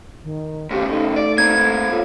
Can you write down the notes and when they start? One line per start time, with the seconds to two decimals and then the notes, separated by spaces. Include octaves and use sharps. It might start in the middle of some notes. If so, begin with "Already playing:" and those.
0.24 D#3
0.71 A2 C#3 G4
0.89 A3 D#4
1.16 D5
1.38 A#3 C4 G#6
1.91 F4 A4 C#5